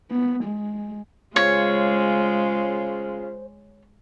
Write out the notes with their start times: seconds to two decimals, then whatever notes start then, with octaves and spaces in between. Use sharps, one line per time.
0.11 B3
0.44 G#3
1.36 C#3 G#3 F4 C5 C#5